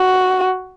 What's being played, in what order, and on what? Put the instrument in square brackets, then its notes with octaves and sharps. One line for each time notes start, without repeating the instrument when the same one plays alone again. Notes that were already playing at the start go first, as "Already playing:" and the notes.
Already playing: [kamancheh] F#4